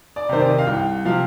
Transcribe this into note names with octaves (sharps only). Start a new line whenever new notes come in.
D5
C3 D#3 C5
D5
D#5
F5
C2 G5
C3 F3 F5